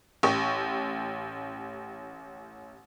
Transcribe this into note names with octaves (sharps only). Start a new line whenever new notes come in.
A1 G4 C#6